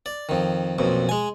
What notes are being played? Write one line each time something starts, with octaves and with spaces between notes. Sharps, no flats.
D5
F2 D#3
B1 F2 A#2
G#3 G#5